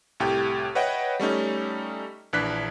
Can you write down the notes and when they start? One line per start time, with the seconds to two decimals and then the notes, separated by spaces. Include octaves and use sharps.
0.20 C2 A2 G4 G5
0.75 B4 C#5 D#5 E5 F#5 G5
1.20 G3 A3 C#4 D#4
2.33 A#1 E3 D4 F#6 B6